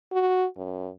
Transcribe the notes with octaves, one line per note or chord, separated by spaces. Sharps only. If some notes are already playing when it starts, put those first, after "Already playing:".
F#4
F#2